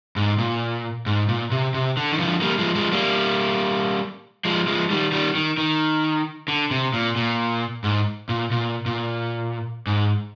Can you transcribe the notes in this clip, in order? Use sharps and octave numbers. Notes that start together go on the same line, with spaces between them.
G#2
A#2
G#2
A#2
C3
C3
D3
D#3
D3 F3
G3 A#3
F3 G#3
F3 G#3
G3 A#3
F3 G#3
F3 G#3
D#3 G3
D#3 G3
D#3
D#3
D3
C3
A#2
A#2
G#2
A#2
A#2
A#2
G#2